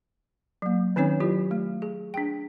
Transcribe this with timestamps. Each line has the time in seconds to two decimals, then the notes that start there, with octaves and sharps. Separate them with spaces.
0.62 F#3 A#3
0.96 D#3 C4 C#4 D#4 C#5
1.20 F#3 E4 F4 G4
1.51 A3
1.82 G#4
2.14 D4 G#4 G5